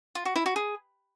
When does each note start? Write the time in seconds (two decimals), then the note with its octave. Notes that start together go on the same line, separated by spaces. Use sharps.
0.15 F4
0.25 F#4
0.36 E4
0.46 F#4
0.56 G#4